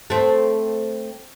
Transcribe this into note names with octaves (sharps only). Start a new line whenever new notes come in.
A3 C4